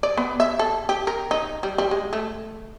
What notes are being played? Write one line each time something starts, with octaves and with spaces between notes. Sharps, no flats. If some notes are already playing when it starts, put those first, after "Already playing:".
D5
B3
E5
A4
G4
A#4
D#4
G3
G3
G#3
A3